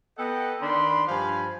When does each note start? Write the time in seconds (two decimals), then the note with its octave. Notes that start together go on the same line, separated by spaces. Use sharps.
0.18 B3 A4 D#5 F#5 G5
0.61 D#3 D4 B5 C6
1.08 G2 F3 C5 F5 G#5 B5